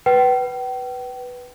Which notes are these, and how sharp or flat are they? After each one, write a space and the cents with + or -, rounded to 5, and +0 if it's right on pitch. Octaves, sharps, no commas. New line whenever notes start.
B4 +0 G5 -40